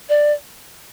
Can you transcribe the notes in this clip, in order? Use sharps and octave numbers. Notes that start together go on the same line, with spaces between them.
D5